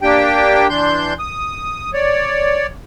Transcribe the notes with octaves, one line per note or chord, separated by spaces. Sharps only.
A#3 D4 G4 G5
E3 D4 C6 G6
D#6
C#5 D5